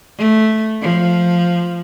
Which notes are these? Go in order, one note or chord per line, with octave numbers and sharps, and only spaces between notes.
A3
F3